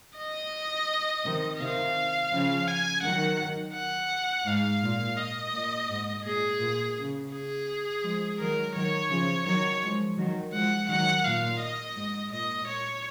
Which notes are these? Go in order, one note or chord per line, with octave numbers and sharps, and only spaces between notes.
D#5
C3 D#3
C3 D#3 F5
C#3 F3
G#5
D#3 F#3 F#5
F#5
G#2 F5
A#2
D#5
A#2
G#2
A#2 G#4
A#2
C#3
G#4
F3 G#3
D#3 F#3 A#4
D#3 F#3 C#5
C#3 F3
D#3 F#3 C#5
F3 G#3
D#3 F#3
F3 G#3 F#5
D#3 F#3 F#5
A#2 F5
D#5
G#2
A#2 D#5
C#5